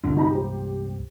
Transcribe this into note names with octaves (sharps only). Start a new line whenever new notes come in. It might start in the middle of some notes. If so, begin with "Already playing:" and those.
C2 G2 D3 G#3
D#4 A#5 B5
G4 C5